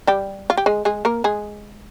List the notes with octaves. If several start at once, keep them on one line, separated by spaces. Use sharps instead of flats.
G3 G4
F4
G4
G#3 G#4
G#3 G#4
A#3 A#4
G#3 G#4